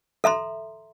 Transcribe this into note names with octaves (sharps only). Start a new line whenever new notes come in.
A4 E5 A#5 C6